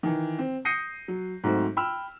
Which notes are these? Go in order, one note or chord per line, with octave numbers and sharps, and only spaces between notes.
D#3 E3
C4
D#6 G6 A#6 C7 C#7 D#7
F#3
G#2 F#3 A3 C4 F#4
G5 B5 E6 F6